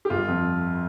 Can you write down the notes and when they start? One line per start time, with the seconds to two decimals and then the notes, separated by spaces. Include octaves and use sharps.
0.05 G4
0.10 G1 F4
0.28 F2